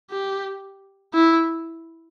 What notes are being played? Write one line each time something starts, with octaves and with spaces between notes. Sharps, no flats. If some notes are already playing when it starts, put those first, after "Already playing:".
G4
E4